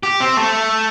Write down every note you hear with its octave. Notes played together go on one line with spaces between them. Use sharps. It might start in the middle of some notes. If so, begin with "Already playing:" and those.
G4
C4
A3